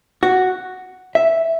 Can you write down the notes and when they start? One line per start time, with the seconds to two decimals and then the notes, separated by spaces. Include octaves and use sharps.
0.23 F#4
1.15 E5